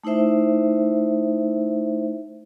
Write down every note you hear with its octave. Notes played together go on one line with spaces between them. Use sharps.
A3 D#4 E4 C5 E5